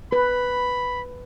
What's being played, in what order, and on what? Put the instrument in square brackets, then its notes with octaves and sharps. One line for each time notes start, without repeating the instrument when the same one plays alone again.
[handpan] B4 [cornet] B5